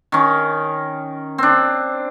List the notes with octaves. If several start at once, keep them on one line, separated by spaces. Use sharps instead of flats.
D#3 C#4
C4 D4